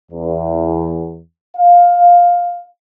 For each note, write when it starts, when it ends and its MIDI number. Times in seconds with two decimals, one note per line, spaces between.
0.12 1.20 40
1.58 2.65 77